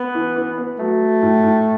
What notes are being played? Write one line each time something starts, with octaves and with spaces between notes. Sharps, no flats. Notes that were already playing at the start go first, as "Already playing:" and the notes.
Already playing: B3
E3
E3
B3
F#3 A3
F#3
A2
A2